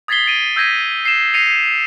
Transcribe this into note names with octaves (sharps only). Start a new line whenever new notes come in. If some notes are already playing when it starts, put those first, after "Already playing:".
D#6 G#6 A6 B6 C7 G7
A6 D7 D#7
E6 G6 G#6 A#6 B6 D#7
C7 E7
A#6 C7 C#7 D#7 F7